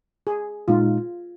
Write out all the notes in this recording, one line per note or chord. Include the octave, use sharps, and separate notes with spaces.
G#4
A#2 G#3 D#4 F4